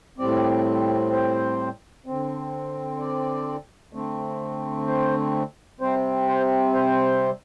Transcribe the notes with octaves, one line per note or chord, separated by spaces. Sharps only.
A2 G3 C4 D5
C5
D3 C4
D5
D3 A3 C4
C5
C3 G3 C4 C5
C5
C5